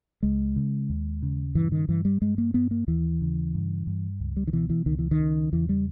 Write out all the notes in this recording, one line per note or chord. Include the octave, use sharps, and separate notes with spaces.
C#2 G#3
C#3
D#2
C#3
G2 E3
D#3
G2 E3
G3
G2 G#3
A#3
G2 B3
A#3
D#2 E3
C#3
G2
G2
C#2
G3
D#3
B2 E3
E3
C#2 D#3
E3
D#3
C#3
E2 E3
G3